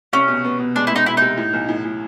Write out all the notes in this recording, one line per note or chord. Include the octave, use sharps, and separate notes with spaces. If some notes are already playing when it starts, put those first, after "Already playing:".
C2 C#4
B2
B3
B2
G#3 D4
E4
G#3
D#4
B2 E4
C2 D#4
A2
B1
A2
A2